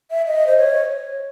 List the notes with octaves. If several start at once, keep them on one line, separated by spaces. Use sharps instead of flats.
E5
D#5
C5
C#5